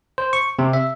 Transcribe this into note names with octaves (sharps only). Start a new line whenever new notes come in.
C5
C#6
C3
E5